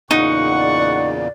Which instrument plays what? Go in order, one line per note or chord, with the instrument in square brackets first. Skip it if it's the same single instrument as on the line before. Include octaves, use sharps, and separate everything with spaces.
[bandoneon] E2 A#2 C#3 [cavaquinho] D#4 [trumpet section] F#5 C#6
[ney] D5